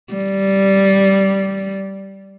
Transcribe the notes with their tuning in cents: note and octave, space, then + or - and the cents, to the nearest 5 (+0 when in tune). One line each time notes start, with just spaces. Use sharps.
G3 -10